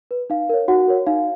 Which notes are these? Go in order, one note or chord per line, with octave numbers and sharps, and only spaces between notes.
B4
D#4 F5
A#4 C#5
D#4 F#4 F#5
A#4 C#5
D#4 F5